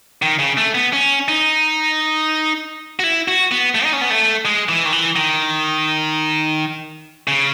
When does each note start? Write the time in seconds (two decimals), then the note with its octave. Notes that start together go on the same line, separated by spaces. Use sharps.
0.22 D#3
0.39 C#3
0.57 A3
0.75 B3
0.93 C#4
1.28 D#4
2.99 F#4
3.04 E4
3.28 F#4
3.51 B3
3.75 A3
3.84 D#4
3.93 C#4
4.01 B3
4.10 A3
4.45 G#3
4.69 E3
4.85 D#3
4.92 E3
5.16 D#3
7.28 C#3